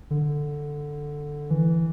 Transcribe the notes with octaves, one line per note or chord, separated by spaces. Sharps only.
D3
E3